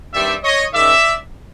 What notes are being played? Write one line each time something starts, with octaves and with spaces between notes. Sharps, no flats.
G2 D#3 G3 C4 D5 E5
C#5 D#5
D#3 G#3 C#4 D5 E5